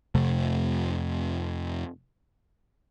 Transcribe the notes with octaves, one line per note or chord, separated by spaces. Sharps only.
F2 C3 A3